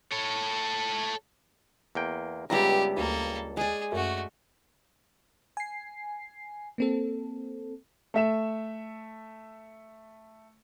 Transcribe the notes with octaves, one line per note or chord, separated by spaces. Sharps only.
A4 C#5
E2 A#3 G5
C#2 G2 G3 B3 G4 E5 A#5
D2 A#3 A4
G#3 G#4 D5
F#2 A3 F#4
G#5 C7
A#3 C4 A4
A3 E5 E7